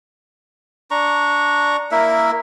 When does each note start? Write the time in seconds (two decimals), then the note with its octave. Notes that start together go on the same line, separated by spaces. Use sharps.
0.91 D4 A#5 C#6
1.91 A#3 E4 A#4 E5